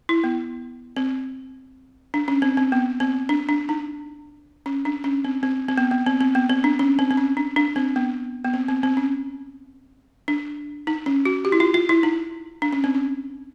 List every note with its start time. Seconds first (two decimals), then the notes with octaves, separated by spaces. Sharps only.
0.09 E4
0.24 B3
0.96 C4
2.14 D4
2.28 C#4
2.42 C4
2.57 C4
2.72 B3
3.00 C4
3.29 D4
3.49 D4
3.69 D#4
4.66 C#4
4.85 D4
5.04 C#4
5.25 C4
5.43 C4
5.69 C4
5.78 B3
5.91 B3
6.06 C4
6.21 C4
6.35 B3
6.49 C4
6.64 D4
6.79 C#4
6.99 C4
7.11 C4
7.17 C#4
7.37 D4
7.56 D4
7.76 C4
7.96 B3
8.44 B3
8.54 C4
8.68 C4
8.83 C4
8.97 C#4
10.28 D4
10.87 D#4
11.06 C#4
11.25 F#4
11.45 G4
11.52 E4
11.60 F4
11.74 F4
11.89 E4
12.03 D#4
12.62 D4
12.73 C#4
12.84 C4
12.95 C#4